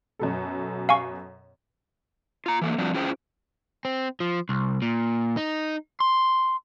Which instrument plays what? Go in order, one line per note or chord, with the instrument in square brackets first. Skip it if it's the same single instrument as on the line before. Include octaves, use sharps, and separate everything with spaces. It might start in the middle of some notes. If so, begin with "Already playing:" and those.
[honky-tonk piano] F#2 B2 A4
[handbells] F5 G#5 C#6
[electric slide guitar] F4 A#5
E3 A3 A#3
F3 G3 C4 D4 F4 F#4
C#4 E4 F4 G#4 C5 G5
[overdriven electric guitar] C4
F3
C2
A#2
D#4
C6